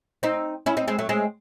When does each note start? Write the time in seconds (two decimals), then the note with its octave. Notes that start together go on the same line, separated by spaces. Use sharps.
0.23 C4 D#4
0.66 C#4 E4
0.77 C4 D#4
0.88 G#3 C4
0.99 F#3 A3
1.09 G#3 C4